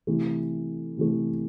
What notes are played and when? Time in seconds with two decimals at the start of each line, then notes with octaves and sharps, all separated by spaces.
0.07 C3 E3 A3
0.97 C3 E3 A3